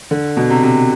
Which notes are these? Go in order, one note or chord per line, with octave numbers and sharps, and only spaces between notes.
D3
B2
C3
C3